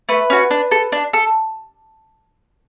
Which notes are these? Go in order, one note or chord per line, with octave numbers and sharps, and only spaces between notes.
A3 B4
C#4 F#4
D4
A4
D4
A4